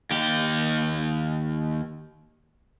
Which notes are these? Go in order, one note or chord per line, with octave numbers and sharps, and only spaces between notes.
D#2 G4